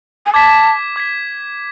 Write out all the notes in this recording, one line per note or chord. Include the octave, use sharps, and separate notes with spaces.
G#5
A5 D6 G#6 B6
D6 G#6 B6